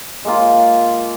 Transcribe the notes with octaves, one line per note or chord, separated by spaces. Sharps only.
G#3 A#3 F4